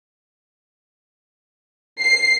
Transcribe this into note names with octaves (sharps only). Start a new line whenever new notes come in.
C7